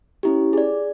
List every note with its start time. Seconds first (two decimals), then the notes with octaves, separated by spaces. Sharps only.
0.23 C#4 E4 G4
0.53 G#4 D5